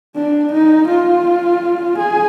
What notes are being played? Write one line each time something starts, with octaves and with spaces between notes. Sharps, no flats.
D4
D#4
F4
G#4